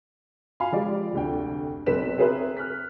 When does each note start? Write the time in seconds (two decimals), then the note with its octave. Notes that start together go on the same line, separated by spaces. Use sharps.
0.60 F4 F5 G#5 B5
0.72 F3 G#3 G4 D5
1.13 F1 D2 G5
1.86 B1 C4 A4 B4 B6 E7
2.18 C4 G#4 A#4 B4 E5
2.57 F6 F#6 B6